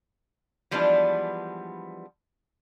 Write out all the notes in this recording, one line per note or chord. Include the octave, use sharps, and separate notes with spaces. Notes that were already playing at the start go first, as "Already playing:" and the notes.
E3 F3 G3 G#3 B3 D4